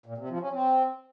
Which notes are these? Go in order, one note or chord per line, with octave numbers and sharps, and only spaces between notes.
A#2
C3
F3
C#4
C4